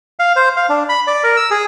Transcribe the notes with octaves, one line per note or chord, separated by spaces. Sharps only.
F5
C5
F5
D4
B5
D5
A#4
E6
G#4